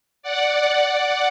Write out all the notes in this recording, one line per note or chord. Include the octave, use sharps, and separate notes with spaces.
D5 F#5